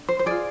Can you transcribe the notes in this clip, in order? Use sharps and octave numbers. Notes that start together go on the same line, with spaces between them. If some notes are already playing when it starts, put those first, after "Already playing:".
Already playing: D4
C5
C5
F4 G#4 D5